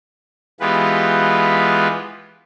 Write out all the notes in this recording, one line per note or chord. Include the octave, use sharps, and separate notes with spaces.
E3 G#3 B3 F4 G4 B4